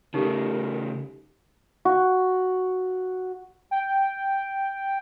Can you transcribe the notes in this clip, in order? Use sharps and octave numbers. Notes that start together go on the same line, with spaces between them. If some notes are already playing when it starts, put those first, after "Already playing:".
C#3 A3 D#4 G4 A4 A#4
F#4
G5